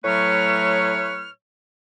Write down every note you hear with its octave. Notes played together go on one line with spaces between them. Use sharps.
A2 F#3 A3 B4 C#5 F6